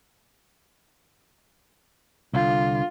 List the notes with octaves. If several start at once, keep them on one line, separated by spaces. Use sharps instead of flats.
C2 D3 F4